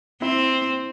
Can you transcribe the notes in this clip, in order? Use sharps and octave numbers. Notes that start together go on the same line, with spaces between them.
C4 E4